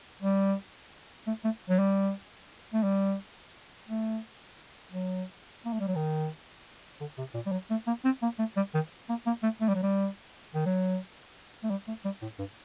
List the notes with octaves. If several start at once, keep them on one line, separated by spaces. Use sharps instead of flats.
G3
A3
A3
F#3
G3
A3
G3
A3
F#3
A#3
A3
G3
F#3
D#3
D3
C3
A#2
G3
F#3
A3
A#3
C4
A#3
A3
G3
D#3
A#3
A#3
A3
A3
G3
F#3
G3
D#3
F#3
A3
G3
A3
G3
A2
G2